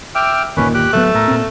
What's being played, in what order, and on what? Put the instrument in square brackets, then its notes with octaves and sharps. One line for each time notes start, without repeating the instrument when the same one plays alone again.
[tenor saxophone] E5 [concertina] G5 D6 F6
[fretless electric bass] G1 D#2 A#2 [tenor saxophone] D#3 [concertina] C#4 B4
[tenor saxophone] G4 [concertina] F#6
[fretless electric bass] D1 F#3 B3 [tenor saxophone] A3
[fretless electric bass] A2 [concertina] A4 A#4
[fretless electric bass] A#2 C4